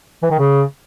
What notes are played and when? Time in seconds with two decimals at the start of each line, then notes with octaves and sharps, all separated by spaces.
0.23 E3
0.31 D#3
0.38 C#3